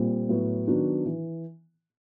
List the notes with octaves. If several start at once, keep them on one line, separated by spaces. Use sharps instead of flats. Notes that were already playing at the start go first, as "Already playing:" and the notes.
Already playing: A#2 G3 C4
A2 F#3 B3
D#3 F#3 B3 D4 F#4
E3